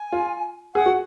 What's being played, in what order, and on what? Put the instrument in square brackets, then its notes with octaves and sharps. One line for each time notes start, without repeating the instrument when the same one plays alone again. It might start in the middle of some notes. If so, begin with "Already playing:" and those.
Already playing: [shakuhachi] G#5
[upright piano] F4
[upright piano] G#4 [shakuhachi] F#5
[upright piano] F#4